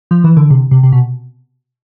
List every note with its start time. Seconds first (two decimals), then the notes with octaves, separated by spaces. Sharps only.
0.11 F3
0.24 E3
0.37 D3
0.50 C3
0.71 C3
0.83 C3
0.92 B2